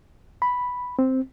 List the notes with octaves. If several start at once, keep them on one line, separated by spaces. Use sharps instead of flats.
B5
C4